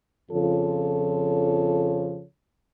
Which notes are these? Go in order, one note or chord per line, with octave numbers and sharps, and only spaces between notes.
F2 C#3 F3 F4 A4 C#5